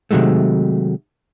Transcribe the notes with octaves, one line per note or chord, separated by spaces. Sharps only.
C3 D#3 F#3 G#3 A3